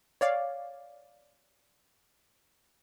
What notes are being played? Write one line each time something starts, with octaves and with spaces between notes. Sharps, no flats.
C#5 D5 F5